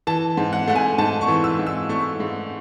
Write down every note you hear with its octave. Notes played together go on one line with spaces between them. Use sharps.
E3 A5
G#2
F#5
A3 F#5
G#5
G#2 A5
C#6
E3
E6
G#2
E6
A3 C#6
G#2